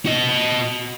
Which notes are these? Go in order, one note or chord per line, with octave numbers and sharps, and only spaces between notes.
F#4 D#5